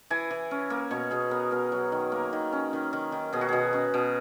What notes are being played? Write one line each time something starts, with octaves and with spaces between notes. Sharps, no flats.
E3 G#5
E3
C#4
A#3
B2 C#5
B2 G#4
B3 A#4
B2 A#4
F#3
D#3
A#3
D#3
C#4
D#3
D#3
D#3
B2 G#4
F#4
B2 G#4
C#4
B2